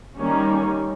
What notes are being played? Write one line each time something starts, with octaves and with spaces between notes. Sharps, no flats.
D#3 G3 A#3 C#4